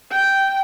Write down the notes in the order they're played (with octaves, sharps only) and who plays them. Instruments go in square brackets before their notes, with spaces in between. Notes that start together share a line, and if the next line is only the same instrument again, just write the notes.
[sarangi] G5